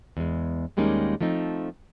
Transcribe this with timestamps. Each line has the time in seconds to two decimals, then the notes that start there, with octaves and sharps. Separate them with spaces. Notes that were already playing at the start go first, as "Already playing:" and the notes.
0.17 E2 G#3
0.77 D#2 G3 G#3 A#3 C#4 D#4
1.20 F3 A3 C4 D#4